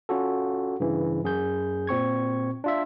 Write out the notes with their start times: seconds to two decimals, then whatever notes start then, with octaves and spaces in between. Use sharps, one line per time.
0.09 C#4 F4 F#4 A4
0.80 G2 C#3 E3
1.24 F#2 G#4 G6
1.87 A#2 C4 C#6 G#6
2.64 D4 F4 E5